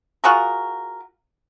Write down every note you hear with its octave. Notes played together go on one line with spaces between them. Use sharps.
F4 F#4 G#4 A#4